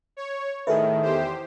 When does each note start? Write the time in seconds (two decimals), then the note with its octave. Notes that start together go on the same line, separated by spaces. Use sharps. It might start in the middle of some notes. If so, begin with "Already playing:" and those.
0.17 C#5
0.67 A2 D#3 G#4 A4 B4 E5
1.02 E2 G4 C5